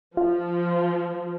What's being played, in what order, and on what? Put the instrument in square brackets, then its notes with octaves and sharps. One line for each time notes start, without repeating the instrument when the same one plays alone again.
[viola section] F3 [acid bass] F4